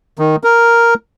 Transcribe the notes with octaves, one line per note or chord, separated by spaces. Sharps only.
D#3
A#4